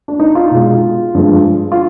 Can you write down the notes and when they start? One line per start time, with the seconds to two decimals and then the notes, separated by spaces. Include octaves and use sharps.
0.08 D4
0.20 D#4
0.35 F4
0.51 B2 G#3
1.14 G2 F3 G#3
1.72 F4